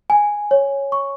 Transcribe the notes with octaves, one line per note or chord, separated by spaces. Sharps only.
G#5
C#5
C#6